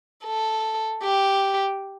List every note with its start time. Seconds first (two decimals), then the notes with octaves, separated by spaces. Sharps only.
0.25 A4
1.03 G4